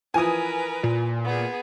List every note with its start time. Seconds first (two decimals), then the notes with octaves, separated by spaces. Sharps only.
0.14 E3 F3 A#4 B4 G#5 D#6
0.83 A#2
1.24 B3 G#4